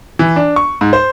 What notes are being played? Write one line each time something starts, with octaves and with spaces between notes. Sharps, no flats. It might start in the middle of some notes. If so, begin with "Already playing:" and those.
E3
D4
C#6
G#2
C5